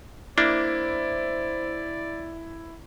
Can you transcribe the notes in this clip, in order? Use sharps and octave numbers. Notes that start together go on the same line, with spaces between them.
A#3 D4 E4 C5 D5